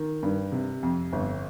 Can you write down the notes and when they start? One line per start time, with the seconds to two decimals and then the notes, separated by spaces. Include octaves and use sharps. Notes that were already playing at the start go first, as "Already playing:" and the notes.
Already playing: D#3
0.23 G2
0.52 C3
0.83 F2
1.13 G1